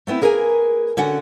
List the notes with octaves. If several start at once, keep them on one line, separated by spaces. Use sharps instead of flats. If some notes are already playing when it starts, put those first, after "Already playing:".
A3 B3 C4 E4
A#3 G#4 A#4 B4 G5 G#5
D3 C#4 F#4 F#5